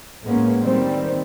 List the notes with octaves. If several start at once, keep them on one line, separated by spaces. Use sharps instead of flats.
A2 G#3 A#3 B3 C#4
D#3 G3 C4